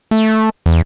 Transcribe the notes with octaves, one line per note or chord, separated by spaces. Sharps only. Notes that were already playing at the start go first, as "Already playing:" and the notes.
A3
E2